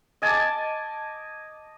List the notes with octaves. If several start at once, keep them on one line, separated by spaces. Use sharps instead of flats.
D#5 G#5 A5 D6